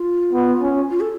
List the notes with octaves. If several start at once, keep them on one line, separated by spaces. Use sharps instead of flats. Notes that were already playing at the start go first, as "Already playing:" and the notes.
Already playing: F4
B3
C#4
F4
A4